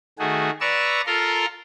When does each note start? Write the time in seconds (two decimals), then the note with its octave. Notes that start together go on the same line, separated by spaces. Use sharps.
0.19 D#3 A3 F#4 G#4
0.61 B4 D5 A#5 C#6 E6
1.06 F4 A4 A#4 A#5 C6